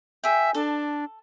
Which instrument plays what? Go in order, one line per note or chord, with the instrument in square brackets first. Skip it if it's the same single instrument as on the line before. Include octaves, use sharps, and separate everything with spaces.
[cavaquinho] G#4 G5 [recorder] E5
[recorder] D4 [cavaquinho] A4